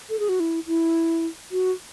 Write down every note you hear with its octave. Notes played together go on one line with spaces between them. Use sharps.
A4
G#4
F#4
E4
E4
F#4